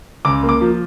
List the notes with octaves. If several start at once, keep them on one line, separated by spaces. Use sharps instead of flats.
C#2 D6
A#3
D6
F3